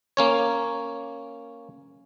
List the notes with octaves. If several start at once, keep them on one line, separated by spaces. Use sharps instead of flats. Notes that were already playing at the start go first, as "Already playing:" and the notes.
A#3 C#4 C#5